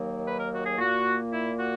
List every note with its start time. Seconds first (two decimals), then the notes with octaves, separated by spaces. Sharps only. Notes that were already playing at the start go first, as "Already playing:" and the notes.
Already playing: D#2 D#3 F#3 A#3
0.25 B4
0.39 A#4
0.53 F#4
0.65 G#4
0.78 A#2 A#3 F#4
1.32 E4
1.58 F#4